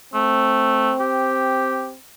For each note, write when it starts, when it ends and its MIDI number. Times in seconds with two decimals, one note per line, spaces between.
0.14 0.93 57
0.14 1.97 60
1.00 1.89 67